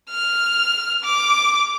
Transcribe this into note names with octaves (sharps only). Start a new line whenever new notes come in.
F6
D6